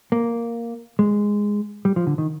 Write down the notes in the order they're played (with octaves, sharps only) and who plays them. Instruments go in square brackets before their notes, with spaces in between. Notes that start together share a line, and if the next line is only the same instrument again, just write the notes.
[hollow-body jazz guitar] A#3
G#3
G3
F3
D3
D#3